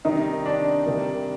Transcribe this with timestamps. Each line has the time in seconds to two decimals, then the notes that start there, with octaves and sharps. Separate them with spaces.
0.05 C3 D#3 G3 D#4
0.46 D4
0.86 C3 D#3 G3 A#3